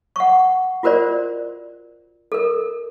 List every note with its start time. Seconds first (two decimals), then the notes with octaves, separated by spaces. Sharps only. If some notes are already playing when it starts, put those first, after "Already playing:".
0.16 F#5 C#6
0.83 F4 F#4 A#4 C5 D5
2.32 A4 A#4